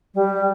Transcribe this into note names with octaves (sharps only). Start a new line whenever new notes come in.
G3